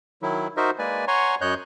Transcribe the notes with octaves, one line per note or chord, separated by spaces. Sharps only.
D#3 F#3 E4
D#4 F#4 A#4 C5 D#5 E5
G#3 A#3 B4 D5 G#5
C#5 F#5 G#5 A#5 C6 C#6
F#2 C#5 D#5 F#6 G6